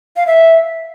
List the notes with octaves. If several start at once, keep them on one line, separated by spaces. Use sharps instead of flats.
F5
E5